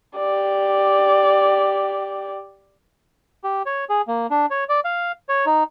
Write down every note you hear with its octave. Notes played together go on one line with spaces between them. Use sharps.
G4 D5
G4
C#5
G#4
A#3
D4
C#5
D5
F5
C#5
D#4